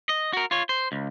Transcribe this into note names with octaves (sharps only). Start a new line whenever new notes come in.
D#5
F#4 A#4
F4 C#5
C5
C#2